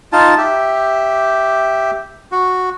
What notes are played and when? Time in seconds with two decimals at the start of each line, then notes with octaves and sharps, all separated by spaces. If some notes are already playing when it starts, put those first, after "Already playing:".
0.13 D#4 F4 A5
0.38 G4 E5
2.32 F#4